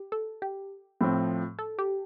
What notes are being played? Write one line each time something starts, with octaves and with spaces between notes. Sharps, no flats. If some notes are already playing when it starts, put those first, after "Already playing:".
Already playing: G4
A4
G4
A2 F3 C4
A4
G4